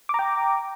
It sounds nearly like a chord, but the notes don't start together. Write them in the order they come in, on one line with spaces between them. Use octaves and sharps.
D6 A#5 G5